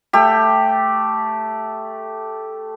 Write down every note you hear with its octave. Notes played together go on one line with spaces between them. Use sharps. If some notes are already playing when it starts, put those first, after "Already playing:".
A3 G4